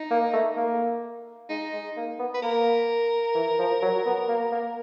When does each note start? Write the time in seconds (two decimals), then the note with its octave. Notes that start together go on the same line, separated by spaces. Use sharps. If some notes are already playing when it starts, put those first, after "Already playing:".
Already playing: D#4
0.11 A#3
0.33 A3
0.57 A#3
1.49 G#3 D#4
1.73 G#3
1.97 A#3
2.19 B3
2.34 B4
2.42 A#3 A#4
3.35 E3
3.59 F3
3.82 F#3
4.06 B3
4.29 A#3
4.52 A#3